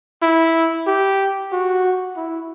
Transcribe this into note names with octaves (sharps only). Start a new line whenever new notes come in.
E4
G4
F#4
E4